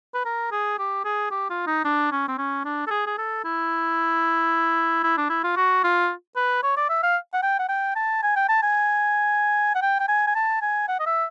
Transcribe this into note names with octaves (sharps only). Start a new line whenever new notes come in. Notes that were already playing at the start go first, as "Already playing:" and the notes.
B4
A#4
G#4
G4
G#4
G4
F4
D#4
D4
C#4
C4
C#4
D4
A4
G#4
G#4
A4
E4
E4
D4
E4
F4
F#4
F4
B4
C#5
D5
E5
F5
F#5
G5
F#5
G5
A5
G#5
G5
A5
G#5
F#5
G5
G5
G#5
G#5
A5
G#5
F#5
D#5
E5